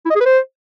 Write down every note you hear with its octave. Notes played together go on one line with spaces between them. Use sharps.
E4
D#5
G#4
B4
C5